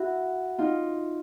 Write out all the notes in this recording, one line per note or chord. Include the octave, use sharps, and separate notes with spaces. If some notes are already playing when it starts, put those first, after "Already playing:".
Already playing: E4 F#4
D#4 F4